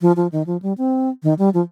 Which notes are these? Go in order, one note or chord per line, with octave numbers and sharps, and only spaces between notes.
F3
F3
D#3
F3
G3
C4
D#3
G3
F3